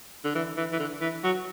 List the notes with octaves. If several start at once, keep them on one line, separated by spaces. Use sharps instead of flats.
D3
E3
E3
E3
D3
E3
F#3